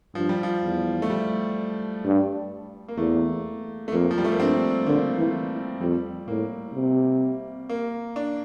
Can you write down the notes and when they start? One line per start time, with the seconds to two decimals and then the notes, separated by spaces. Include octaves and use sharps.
0.15 G2 F3
0.29 G3
0.43 F3
0.63 E2
1.02 A3
1.10 G3
2.04 G2
2.88 A#3
2.98 E2 A3
3.88 A3
3.92 F2 A#3
4.11 F3
4.18 G3
4.24 A3
4.32 A#3
4.39 G2 C4
4.86 D3 A#3
5.18 E3
5.80 F2 G3
6.28 A2 A#3
6.74 C3
7.69 A#3
8.16 D4